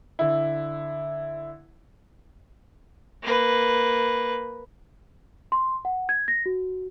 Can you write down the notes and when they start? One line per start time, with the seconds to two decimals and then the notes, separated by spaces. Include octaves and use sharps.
0.19 D3 E4
3.23 A#3 B4
5.52 C6
5.85 F#5
6.09 G#6
6.28 A#6
6.46 F#4